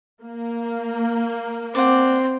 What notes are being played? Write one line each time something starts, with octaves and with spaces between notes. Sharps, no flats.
A#3
C4 D5 F#5